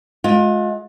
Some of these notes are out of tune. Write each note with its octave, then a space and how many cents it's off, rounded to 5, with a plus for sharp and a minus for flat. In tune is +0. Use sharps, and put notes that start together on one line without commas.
G#3 +25 F4 +35